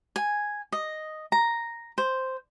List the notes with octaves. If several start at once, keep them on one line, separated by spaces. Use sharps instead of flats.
G#5
D#5
A#5
C5